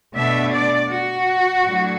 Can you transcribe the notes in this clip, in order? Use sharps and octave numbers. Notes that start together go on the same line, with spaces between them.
B2 A3 D4 E5
D5
F#4
A2 F#3 A3 D4